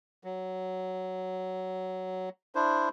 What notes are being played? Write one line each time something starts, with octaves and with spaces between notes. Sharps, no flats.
F#3
D4 E4 C5